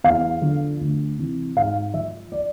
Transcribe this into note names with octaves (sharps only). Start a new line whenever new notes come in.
E2 F5
D3 F3
D2
C3 E3
G#2 F5
F3 E5
D5